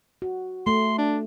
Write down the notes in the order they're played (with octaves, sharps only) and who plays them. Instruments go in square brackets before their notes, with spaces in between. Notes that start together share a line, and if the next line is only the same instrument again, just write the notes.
[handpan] F#4
[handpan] A3 [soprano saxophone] C6
[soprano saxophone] D4